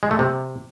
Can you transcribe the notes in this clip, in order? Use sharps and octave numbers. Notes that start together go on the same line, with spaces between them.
G#3
A3
C3